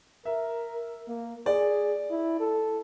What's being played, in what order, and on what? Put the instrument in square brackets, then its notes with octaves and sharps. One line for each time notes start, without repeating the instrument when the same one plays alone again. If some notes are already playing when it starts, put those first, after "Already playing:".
[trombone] A#4 [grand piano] E5
[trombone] A#3
[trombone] G#4 [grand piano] D5
[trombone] E4
A4